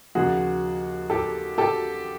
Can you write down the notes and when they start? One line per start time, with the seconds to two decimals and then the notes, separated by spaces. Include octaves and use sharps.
0.15 D#2 C#3 F3 F#4 G#4
1.10 G4 A4
1.58 G4 A4